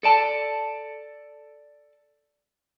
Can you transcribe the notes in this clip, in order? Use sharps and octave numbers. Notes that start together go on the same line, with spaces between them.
A4 D5 A5